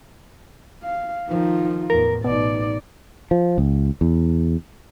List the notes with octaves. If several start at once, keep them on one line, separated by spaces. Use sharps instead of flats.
F5
D#3 F3 D#4 F4
E2 A2 A#4
A1 B2 D#4 D5
F3
C#2
E2